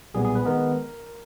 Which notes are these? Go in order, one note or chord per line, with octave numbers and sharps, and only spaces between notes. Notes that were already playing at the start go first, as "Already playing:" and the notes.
B1 A#2 G3 B3 G#4
G#4
B4
D#3 G#3 B3 A#4